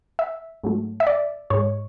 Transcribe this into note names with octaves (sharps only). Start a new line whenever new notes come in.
E5
G#2 F#3 A3
E5
D5
G#2 G#3 C#5